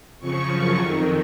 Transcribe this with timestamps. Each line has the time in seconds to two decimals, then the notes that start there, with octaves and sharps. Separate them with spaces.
0.19 F2 C#3 F3 C#6
0.49 F#2 C#3 F3
0.77 F2 D#3